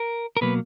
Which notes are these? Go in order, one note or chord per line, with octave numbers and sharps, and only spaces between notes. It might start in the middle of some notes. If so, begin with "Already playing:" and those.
Already playing: A#4
A#4
B2 F#3 A#3 B4